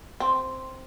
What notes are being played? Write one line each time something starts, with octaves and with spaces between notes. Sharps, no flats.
C4